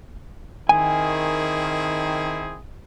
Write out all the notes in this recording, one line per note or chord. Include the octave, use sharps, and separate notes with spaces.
D#3 C4 E4 G#4 G#5